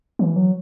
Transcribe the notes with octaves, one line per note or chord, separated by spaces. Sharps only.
E3
F#3